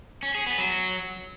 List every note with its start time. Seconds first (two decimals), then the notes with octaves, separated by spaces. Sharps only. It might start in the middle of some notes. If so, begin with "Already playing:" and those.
0.23 C#4
0.35 G#4
0.47 B3
0.58 F#3